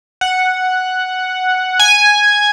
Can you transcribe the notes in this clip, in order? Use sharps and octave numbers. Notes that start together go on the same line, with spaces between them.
F#5
G#5